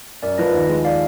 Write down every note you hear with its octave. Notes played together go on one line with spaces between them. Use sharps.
F#2 A#4 D5
F3 B4 D#5
D#2
G#3
D5 F5